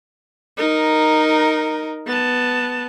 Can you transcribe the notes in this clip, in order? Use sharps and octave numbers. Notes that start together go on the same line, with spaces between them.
D#4 A#4
B3 A5